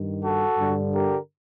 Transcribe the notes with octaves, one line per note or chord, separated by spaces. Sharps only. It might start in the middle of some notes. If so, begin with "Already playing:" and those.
Already playing: G2 D#3
F#4 A4
G2 D3
G4 A#4